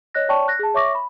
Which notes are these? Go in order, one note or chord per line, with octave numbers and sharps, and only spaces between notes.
C#5 D#5 F#6 A#6
C#5 D5 G5 A5 C#6
F#6 A#6
G#4 A5
C#5 E5 C#6 D6 A#6
B5